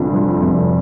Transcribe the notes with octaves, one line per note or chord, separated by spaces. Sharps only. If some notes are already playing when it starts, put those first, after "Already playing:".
Already playing: F1 F2 D3
F3
F1